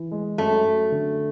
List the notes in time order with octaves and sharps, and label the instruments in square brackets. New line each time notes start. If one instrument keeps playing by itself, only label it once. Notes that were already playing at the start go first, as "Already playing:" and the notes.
Already playing: [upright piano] E3
G#3
[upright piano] F#2 [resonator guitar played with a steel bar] A3
[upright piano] F#2
D3